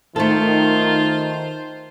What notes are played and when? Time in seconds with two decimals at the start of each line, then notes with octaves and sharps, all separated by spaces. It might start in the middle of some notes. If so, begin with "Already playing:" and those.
0.16 D#3 A3 F4 A4 C5